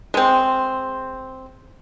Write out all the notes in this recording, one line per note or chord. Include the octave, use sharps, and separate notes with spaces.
G#3 C4